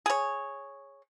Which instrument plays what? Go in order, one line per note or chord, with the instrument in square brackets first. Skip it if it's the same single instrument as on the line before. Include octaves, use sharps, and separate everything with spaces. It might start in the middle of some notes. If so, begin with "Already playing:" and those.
[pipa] G#4 C#5